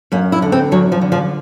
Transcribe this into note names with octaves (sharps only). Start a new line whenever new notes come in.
F#2 A#3
E4
D3
C4
F#2 F#3
F3
D3
F3